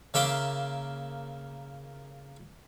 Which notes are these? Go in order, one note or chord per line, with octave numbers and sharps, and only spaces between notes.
C#3 A#3 E5 C6 D6